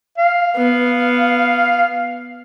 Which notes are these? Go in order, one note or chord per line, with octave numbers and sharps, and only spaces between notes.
F5
B3